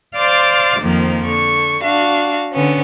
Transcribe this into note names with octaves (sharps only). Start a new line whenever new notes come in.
C5 D5 F5 C6 D6 A6
F2 D#3 F3 A#3
D3 C#6
D4 F#4 F5
D3 B3 C#4